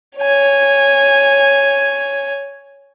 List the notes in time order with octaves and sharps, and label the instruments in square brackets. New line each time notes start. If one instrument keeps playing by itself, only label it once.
[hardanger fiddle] C#5 G#5